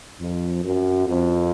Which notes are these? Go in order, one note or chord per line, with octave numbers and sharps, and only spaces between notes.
F2
F#2
F2